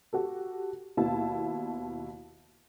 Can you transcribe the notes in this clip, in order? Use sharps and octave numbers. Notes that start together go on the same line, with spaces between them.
F#4 G4 A4
D#2 B2 E4 A5